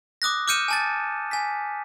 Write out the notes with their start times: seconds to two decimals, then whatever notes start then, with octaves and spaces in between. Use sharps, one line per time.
0.22 D6 D#6 F#6 A#6
0.48 D6 F6 G6 C#7 D#7 E7
0.68 G#5 A5 A6
1.31 G#5 B6